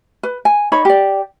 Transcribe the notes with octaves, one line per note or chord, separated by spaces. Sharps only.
B4
G#5
D#4 C#5 B5
G4 D5